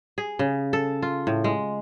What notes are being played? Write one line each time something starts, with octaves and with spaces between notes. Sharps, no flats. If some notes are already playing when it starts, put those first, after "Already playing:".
G#4
C#3
A4
F4
A2
G#3